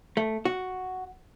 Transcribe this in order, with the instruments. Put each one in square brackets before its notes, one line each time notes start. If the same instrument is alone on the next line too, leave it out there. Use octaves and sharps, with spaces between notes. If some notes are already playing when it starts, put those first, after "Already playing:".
[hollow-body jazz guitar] A3
F#4